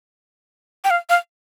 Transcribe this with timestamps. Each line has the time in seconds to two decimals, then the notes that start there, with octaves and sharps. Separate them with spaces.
0.85 G5
0.90 F5
1.10 F5